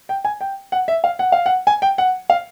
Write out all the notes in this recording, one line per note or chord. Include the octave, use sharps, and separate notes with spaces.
G5
G#5
G5
F#5
E5
F5
F#5
F5
F#5
G#5
G5
F#5
F5